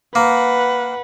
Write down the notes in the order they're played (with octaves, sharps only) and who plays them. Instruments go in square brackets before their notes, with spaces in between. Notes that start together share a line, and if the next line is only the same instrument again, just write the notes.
[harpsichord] A#3 [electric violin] B4 F#5